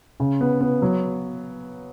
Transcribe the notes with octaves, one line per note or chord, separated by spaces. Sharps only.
C#3
B3
B3
F#3